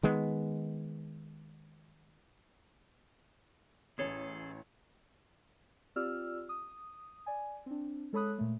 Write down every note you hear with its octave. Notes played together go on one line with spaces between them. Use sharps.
D#3 G#3 B3
A1 C#4 G#4 A4 C#5
C4 F4 G4 D5 E6 F6
D#6
D5 G#5
C4 D4
G#3 A4 C#5 B5 D#6 F#6
A#2 A3